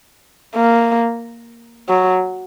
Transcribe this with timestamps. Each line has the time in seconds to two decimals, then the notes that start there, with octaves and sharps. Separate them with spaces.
0.56 A#3
1.89 F#3